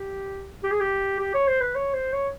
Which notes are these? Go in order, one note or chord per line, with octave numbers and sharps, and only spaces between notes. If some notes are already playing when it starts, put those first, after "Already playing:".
Already playing: G4
G4
G#4
G4
G4
C#5
C5
B4
C#5
C5
C#5